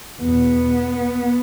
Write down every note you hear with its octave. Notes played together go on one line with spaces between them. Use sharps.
E2 B2 B3